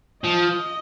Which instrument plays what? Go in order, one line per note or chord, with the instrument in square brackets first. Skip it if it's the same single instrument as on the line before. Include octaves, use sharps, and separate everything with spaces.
[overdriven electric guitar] F3 [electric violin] D#5